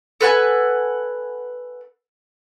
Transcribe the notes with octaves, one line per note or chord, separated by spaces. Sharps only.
A4 B4 F#5 G#5